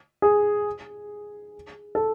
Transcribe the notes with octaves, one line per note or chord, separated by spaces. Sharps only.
G#4
A4